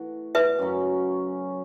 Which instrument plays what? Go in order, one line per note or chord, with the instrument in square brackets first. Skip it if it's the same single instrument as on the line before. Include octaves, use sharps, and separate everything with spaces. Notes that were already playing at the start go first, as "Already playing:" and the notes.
Already playing: [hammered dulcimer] E3 A3 F#4
[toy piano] B4 E5
[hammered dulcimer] F#2 C#3 F#3 C#4